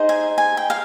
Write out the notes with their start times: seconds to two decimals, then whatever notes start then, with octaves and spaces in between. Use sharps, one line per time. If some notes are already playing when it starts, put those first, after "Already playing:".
Already playing: D#4 G#4 C5 D#5
0.09 G#5
0.38 G#5
0.57 G5
0.70 F5